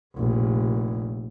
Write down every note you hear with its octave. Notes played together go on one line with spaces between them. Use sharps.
F1 A#1